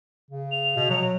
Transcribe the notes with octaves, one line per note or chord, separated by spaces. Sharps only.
C#3
F7
B2
F#3